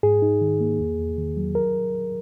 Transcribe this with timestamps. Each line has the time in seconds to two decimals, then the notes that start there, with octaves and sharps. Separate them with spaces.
0.03 G#2 G#4
0.22 D#4
0.41 D#3
0.60 A#3
0.79 E2
0.98 E2
1.17 D#3
1.37 F#3
1.55 A#4